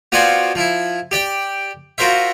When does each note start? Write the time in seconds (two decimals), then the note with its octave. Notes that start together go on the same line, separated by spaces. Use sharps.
0.12 B3 F4 F#4 C5 D5 G#5
0.55 F3 E4
1.11 G4 D5 G5
1.98 F4 F#4 A#4 C5 E5